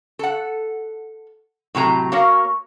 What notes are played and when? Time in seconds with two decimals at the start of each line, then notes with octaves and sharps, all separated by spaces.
0.19 A4 F#5
1.75 A2 C3 F#3 A#5
2.12 A#3 F#4 A#4 C#5 F5